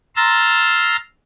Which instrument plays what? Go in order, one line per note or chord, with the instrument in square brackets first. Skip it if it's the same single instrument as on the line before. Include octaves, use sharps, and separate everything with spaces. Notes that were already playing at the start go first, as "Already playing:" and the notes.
[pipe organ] A#5 C6 E6 F6 A6